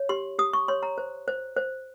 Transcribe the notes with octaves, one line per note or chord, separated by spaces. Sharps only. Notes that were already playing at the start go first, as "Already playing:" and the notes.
Already playing: C#5
G4 C6
G4 D#6
C#6
C#5 C6
A#5
C5
C5
C5